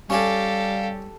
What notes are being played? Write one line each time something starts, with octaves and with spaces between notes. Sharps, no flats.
G3 C#4 G4 A4 D5 F5 G#5